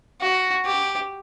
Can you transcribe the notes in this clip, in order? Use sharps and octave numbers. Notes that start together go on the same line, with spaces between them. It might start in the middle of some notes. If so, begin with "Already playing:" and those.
F#4
G4